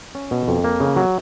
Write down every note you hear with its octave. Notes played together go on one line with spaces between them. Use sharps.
C#4
B2
F2
A#3
C#3
F#3